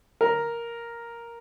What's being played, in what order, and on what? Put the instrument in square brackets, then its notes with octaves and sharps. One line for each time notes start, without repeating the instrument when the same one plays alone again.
[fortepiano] A#4